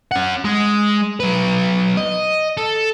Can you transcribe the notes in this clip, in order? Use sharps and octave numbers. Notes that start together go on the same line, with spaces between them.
C#4 F#5
G#3
F#3 B4
D#5
A4